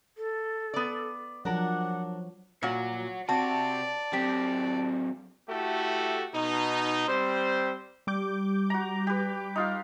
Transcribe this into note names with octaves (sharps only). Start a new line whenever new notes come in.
A4
B3 D5
F3 F#3 D4 A#4 F#5
A#2 F#4 C#5 F#5
C3 F#4 G4 D5 A5
F#3 C4 G4
A3 E4 F#4 G4 A4
B2 D#4
G3 C4 C5
G3 D6 G6
F#4 A#5
G4 B4
D#4 F4 F5